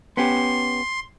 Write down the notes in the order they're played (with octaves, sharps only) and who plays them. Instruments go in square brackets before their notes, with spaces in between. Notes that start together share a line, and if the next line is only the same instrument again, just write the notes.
[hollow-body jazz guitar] B3 C#4 G4 [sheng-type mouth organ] C6